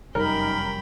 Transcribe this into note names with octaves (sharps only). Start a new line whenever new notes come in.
F1 F#2 G3 D#4 A#4 G5 B5